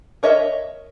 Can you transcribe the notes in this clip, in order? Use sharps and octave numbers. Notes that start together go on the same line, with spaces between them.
A#4 C#5 D#5 E5